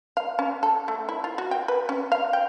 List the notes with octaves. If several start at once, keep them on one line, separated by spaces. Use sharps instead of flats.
F5
C#4
A4
A3
E4
F4
F#4
G5
B4
C#4
F5
G5